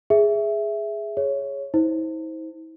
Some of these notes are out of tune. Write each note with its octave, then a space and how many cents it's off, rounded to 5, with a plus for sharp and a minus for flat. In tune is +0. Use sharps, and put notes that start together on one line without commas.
G#4 +0 E5 +0
G#4 +0 C#5 +0
E4 -45 C5 +0